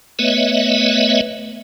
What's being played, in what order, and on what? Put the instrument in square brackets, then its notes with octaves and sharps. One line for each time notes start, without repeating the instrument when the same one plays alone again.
[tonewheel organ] A3 B3 B4 C#5 D#5 E5